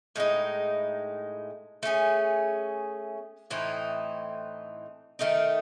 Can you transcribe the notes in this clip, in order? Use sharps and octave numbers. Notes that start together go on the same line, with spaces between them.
A2 G#3 D#4
A3 C#4 G#4
A2 E3 C4 D#4
D#3 A3 D#4